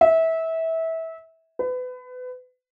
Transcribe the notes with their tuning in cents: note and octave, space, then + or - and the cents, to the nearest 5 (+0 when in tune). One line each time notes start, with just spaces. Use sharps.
E5 -20
B4 +30